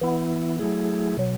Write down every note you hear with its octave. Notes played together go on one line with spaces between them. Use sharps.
E3 B3 E4
F#3 A3 E4 G#4
B2 F#3